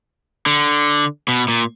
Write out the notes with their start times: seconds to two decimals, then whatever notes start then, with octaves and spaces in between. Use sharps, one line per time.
0.46 D3
1.28 B2
1.48 A#2